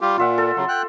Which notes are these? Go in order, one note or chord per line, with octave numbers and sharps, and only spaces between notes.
G3 F4 G4
A#2 F4 E5 F#5
A4
C#3 F#3 C6
G5 F#6